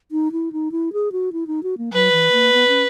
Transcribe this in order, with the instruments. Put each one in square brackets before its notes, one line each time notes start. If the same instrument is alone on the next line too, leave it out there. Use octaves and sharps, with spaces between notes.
[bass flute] D#4
E4
D#4
E4
G#4
F#4
E4
D#4
F#4
A#3
[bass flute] F#3 [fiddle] B4
[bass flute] E3
A#3
B3
C#4